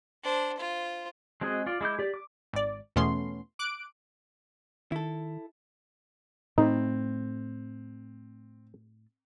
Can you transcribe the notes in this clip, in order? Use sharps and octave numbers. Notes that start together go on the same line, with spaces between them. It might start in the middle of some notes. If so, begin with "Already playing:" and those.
D4 C5
F4 C5
G#3 C4 F#4 G#4 D#5
F4 D5
G#3 E4 D6 G6
G4 D5
D6
G#1 D5
E2 B2 A3 B3 C#4 C6
D6 F#6 D7
D#3 E4 A4
A2 A3 C4 D#4